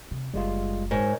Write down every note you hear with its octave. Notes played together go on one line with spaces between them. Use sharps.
C3
F#1 G3 G#3 F4
G#2 A#4 C#5